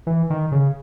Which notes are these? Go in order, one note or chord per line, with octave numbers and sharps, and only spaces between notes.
E3
D#3
C#3